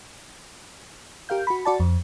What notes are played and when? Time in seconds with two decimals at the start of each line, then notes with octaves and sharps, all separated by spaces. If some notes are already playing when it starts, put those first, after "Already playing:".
1.29 G4 A#4 F5 G6
1.47 F#4 B5
1.65 F#4 D5 A5
1.80 F2